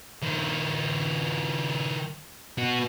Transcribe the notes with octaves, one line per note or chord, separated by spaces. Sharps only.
D#3 F3
B3 F#4